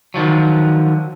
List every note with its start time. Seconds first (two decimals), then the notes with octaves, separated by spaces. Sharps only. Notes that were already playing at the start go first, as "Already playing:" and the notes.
0.14 D3 D#3 F3 F#3